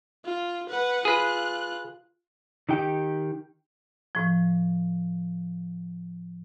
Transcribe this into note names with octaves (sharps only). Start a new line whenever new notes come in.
F4
B4 F#5
F4 G#4 B4 F#6
D#3 D#4 G4 G5
A2 F3